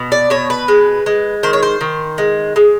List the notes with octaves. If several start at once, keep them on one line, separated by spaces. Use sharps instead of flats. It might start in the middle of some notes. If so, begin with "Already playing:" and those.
Already playing: B2
D5
B2 C#5
B4
G#3
G#3
D#3 C5
C#5
C5
D#3
G#3
G#3